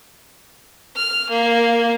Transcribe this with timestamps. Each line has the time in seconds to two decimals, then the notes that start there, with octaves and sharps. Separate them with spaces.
0.96 F6
1.30 A#3